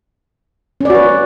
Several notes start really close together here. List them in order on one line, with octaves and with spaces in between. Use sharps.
C#4 D5 F#4 B4